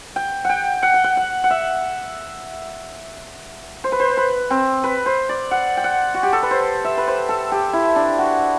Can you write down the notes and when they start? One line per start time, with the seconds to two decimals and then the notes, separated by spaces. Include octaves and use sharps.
0.16 G5
0.44 F#5 G5
0.83 F#5
0.94 G5
1.04 F#5
1.17 F#5
1.44 F#5
1.50 E5
3.84 C5
3.92 B4
4.00 C5
4.17 B4
4.50 C4
4.84 B4
5.06 C5
5.29 D5
5.51 F#5
5.77 G5
5.84 F#5
6.14 F#4
6.23 G4
6.33 A4
6.42 B4
6.51 C5
6.84 E5
6.97 B4
7.08 C5
7.29 A4
7.52 G4
7.73 E4
7.96 D4
8.18 F#4